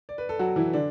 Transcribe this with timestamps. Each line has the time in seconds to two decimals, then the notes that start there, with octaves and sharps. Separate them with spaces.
0.09 D5
0.18 B4
0.29 A4
0.39 F#3 F#4
0.56 E3 E4
0.73 D3 D4